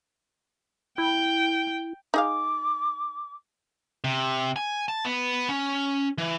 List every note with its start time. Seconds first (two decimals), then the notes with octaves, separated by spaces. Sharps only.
0.98 E4 G5
2.14 D#4 G#4 F5 D6
4.04 C3
4.56 G#5
4.88 A5
5.05 B3
5.49 C#4
6.18 E3